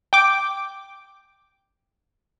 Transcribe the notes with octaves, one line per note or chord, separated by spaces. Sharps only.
G5 D6